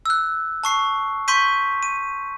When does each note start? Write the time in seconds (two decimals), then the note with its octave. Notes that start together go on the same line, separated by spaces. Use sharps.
0.06 E6 F#6
0.64 A5 C#6 C7
1.28 C6 C#6 G6 B6 D#7
1.83 D#7